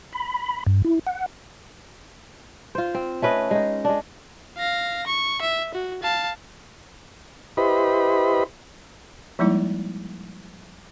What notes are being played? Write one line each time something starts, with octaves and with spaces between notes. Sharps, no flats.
B5
G2
E4
F#5
F4 C5
C4
A3 C#4 B4 D#5
G#3 D#4
G#3 D4
F5 A#6
C#6
E5
F#4
F5 A5
E4 G4 B4 C5 D#5 B5
F3 G3 G#3 A#3 D#4 E4